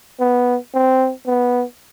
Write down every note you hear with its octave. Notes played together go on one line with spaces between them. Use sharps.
B3
C4
B3